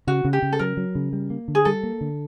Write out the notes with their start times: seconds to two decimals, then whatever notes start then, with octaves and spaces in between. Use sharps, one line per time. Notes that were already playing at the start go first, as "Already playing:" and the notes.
0.07 C#3 F#4
0.25 C#3
0.33 G4
0.42 C#3
0.53 A4
0.59 F#3 A#4
0.77 F#3
0.95 C#3
1.13 G3
1.30 A#3
1.48 D3
1.55 G#4
1.65 G3 A4
1.83 A#3
2.01 D3